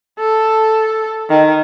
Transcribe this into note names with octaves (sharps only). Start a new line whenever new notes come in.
A4
D#3